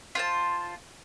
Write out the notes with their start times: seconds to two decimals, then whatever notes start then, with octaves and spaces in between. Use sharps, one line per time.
0.15 F4 C5 A5